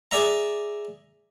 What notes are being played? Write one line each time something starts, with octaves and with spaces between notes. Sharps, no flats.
G#4 D5 E5 A#5